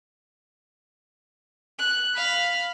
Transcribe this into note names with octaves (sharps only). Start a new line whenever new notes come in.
F#6
F5 B5